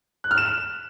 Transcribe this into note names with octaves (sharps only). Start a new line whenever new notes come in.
F#6
F6
E7